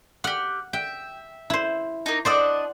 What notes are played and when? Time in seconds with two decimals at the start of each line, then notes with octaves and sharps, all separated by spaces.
0.24 G4 F#5 F6
0.73 E5 G5
1.50 E4 C5
2.06 A#3 D#4
2.25 D4 C5 D5 D#5 F#5 E6